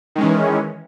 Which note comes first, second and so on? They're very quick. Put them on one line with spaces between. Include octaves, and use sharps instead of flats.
D#3 G#3 C#4 E3